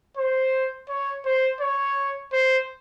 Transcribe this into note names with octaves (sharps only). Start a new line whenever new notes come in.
C5
C#5
C5
C#5
C5